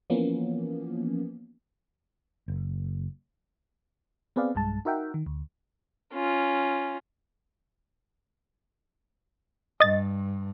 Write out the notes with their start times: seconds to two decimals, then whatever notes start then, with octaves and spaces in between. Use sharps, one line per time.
0.10 E3 F3 A#3 B3 C#4
2.48 F#1
4.36 B3 C4 G#4 B4 D5 F5
4.55 B1 G2 G#3 A5
4.85 D#4 F#4 A#4 E5 F#5 G5
5.14 D#3
5.26 D2
6.13 C#4 F4
9.80 G2 D#5 A6